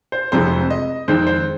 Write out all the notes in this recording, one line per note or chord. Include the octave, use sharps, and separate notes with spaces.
C5
F1 F2 C3 F3 G#3 C5
D#5
F2 D#3 G#3 C4 C5
C5